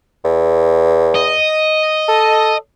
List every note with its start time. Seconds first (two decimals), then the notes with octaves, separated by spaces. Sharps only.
0.24 E2
1.15 D#5
2.09 A4